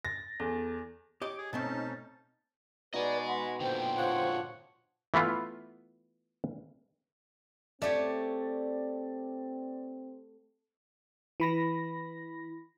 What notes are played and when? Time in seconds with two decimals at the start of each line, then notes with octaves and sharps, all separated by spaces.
0.05 A6 A#6
0.40 E2 A4
1.22 G4 C#5 D#5 D6
1.38 G#4
1.53 B2 A3 C4 C#4 D#4 A5
2.94 B2 D#4 F#4 B4 D5 D#5 G#5
3.26 F#5 B5 C6
3.60 A#2 D3 C5 G5
3.98 F3 G4 C#5 F#5
5.14 E3 A3 B3 F4
7.82 A3 C4 G4 C#5 D5
11.40 E3 B5 A#6